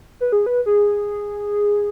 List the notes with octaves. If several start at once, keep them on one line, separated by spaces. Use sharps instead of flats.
B4
G#4
B4
G#4